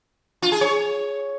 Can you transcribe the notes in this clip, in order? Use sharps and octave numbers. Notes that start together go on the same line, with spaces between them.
F4
G#4
C#5